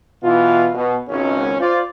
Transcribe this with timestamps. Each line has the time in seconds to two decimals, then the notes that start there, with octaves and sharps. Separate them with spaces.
0.24 B2 E3 E4 F4
0.75 B2
1.08 G#1 C#2 C#4
1.60 F4 C5 D5